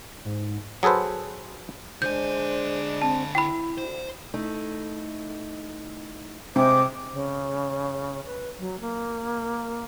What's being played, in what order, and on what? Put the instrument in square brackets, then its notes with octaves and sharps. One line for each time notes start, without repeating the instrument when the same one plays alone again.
[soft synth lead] G#2
[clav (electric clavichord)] F#3 G#4 A4 B4 C5
[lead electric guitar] D3 G#5 [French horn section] G#3 D4 [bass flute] C5 [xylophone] G6
[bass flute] C4 [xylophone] A5
[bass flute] E4 [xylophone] G5 B5
[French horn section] D2 [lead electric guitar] C5
[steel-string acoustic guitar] A3 D#4 E4
[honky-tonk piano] C3 [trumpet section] G#3 G5 D6 [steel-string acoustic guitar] G#4 [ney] C5
[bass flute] C#3
B4
F#3
A#3